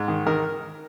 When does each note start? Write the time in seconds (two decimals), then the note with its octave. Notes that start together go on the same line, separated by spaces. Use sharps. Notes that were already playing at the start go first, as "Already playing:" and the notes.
Already playing: G#2
0.08 D#3
0.26 D#3 A#4